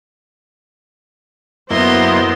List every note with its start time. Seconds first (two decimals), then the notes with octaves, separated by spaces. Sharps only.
1.71 F#2 A#3 B3 E4 C5 D#5 C6